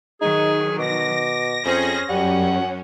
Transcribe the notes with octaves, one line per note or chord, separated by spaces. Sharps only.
D#3 F#3 D#4 G#4
B2 D6 A#6
F2 C#4 G#4 C5
F#2 G3 C#4 F#5